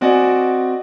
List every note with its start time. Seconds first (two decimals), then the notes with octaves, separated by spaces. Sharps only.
0.01 C4 F#4 D5 D#5 G#5